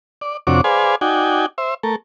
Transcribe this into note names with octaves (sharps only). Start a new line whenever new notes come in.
D5
F2 C3 D4 F#4 C#5 D6
G#4 B4 C5 D5 F5 G#5
D#4 F#4 D5 G5 G#5
C5 E5
A3 A4 A#4